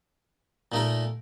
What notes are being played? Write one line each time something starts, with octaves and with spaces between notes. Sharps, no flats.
A#2 A3 D#4 A#4